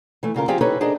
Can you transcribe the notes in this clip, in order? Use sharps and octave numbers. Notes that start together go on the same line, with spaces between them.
E3 A3
D2 C#3 F4 A#4
F3 C4 F4 G4 G#4
D#4 E4 G4 A4 B4 C#5
D4 G#4 A#4 C5 D#5